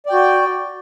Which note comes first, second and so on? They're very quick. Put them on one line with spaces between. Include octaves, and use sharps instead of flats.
D5 G5 F#4